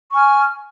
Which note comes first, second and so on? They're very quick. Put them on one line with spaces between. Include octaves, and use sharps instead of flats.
C#6 G#5 F6